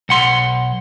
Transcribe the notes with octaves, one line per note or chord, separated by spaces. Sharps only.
B1 F#5 C6